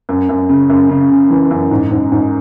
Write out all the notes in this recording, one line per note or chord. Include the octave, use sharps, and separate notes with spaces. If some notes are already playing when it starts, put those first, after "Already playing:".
F#2
F#2
C#3
F#2
C#3
C#3
E3
F#2
G#2
G#2
G#2